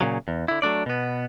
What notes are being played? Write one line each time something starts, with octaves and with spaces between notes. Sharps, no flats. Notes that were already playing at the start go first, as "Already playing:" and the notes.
A#2 C#3 F#3
E2
D3 E4
F#3 A3 D4 D5
B2 B3